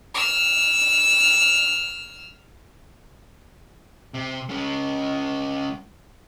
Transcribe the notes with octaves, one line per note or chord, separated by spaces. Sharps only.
E6 F6
C3
G#3 C#4